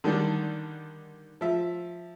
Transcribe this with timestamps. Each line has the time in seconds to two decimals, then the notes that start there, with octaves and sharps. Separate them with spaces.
0.04 D3 D#3 G3 D4
1.41 F3 E5